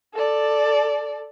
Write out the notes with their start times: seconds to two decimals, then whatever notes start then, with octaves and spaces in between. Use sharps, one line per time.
0.14 A4 D5